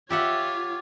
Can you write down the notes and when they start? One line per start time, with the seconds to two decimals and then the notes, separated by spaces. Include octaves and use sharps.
0.10 F4 G4 C#5 E5 F#5